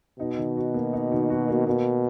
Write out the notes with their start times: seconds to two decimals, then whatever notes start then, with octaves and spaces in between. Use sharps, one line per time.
0.19 B2 D#4
0.37 D#3
0.56 F#4
0.74 A#3
0.93 D#4
1.12 D#3
1.30 F#4
1.48 A#3
1.67 B2 A#3